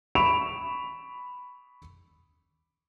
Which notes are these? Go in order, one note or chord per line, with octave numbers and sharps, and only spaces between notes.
B5 C#6 D7 E7 F7